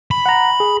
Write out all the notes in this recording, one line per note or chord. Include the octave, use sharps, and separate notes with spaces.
B5
F#5 A#5
G#4